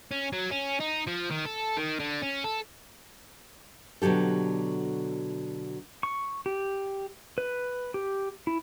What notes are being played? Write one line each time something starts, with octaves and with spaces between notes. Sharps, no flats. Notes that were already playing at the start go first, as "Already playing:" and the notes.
C#4
F#3
C#4
D#4
F3
D#3
A4
D#3
D3
C#4
A4
B2 D3 F#3 G4 A4
C#6
G4
B4
G4
E4